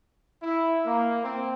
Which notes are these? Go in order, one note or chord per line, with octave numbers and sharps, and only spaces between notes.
E4
A#3
C4